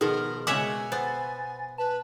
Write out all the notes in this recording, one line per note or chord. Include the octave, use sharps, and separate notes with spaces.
B2 D#3 F3 G#4 A#4
C#3 G#3 C#5 E5 F#5 G#5 D6
B3 C5 A6
B4 A5